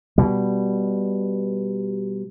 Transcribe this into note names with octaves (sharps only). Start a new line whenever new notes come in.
B2 G3